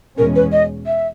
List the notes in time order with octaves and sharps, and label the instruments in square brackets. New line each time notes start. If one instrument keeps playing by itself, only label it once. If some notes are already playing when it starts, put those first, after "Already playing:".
[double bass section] E2 B2 G#3 C#4 [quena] A#4
[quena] B4
D#5
E5